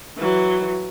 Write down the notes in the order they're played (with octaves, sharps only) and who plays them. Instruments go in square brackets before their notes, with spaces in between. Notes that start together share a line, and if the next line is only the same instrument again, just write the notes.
[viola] E3 F#3